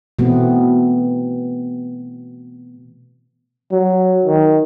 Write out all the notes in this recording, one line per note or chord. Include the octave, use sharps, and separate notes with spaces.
B2 E3 A3 B3 C4
F#3
D#3